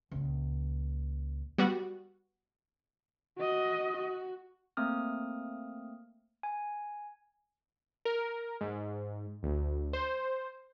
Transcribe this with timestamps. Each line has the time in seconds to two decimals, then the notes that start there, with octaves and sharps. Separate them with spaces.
0.11 C#2 A#2
1.58 G3 B3 F#4
3.38 F#4 D#5
3.96 F#4
4.77 A3 A#3 C4 D#6 F6
6.43 G#5
8.05 A#4
8.61 G#2
9.43 D2
9.93 C5